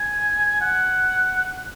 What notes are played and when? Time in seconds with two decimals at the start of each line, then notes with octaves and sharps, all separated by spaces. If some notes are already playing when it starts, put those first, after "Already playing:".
Already playing: G#5
0.61 F#5